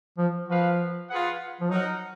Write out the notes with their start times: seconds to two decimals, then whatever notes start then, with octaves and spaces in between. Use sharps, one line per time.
0.18 F3
0.48 F3 F#4 B4 F5
1.09 F4 G#4 B4 F#5
1.61 F3
1.71 F#3 D#4 A#4 D#5 F#5